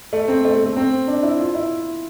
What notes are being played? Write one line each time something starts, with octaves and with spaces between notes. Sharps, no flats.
A3
C4
A3
A3
A3
C4
D4
E4
F4
E4